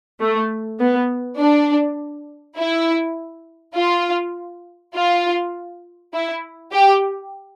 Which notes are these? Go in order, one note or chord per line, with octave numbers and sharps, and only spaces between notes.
A3
B3
D4
E4
F4
F4
E4
G4